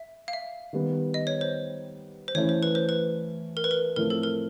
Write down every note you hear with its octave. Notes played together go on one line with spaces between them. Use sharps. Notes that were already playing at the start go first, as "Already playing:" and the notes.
Already playing: E5
F5
E5
D#3 G3 B3
D#5
C#5
C5
C5
E3 A3 C#4 E4 C#5
C5
B4
C5
B4
A#4
B4
A#4
A2 F3 A3 C4 A#4
A4
A#4